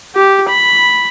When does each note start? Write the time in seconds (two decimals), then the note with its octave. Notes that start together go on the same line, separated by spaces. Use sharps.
0.16 G4
0.49 B5